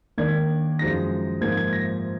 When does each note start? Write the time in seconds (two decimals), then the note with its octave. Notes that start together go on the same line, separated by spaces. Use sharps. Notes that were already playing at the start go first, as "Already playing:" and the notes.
0.18 D#3 A#3 D4 G#6
0.79 F#2 F3 G#3 D#4 A#6
1.41 G#2 F3 A#3 D#4 G#6
1.57 G#6
1.73 A#6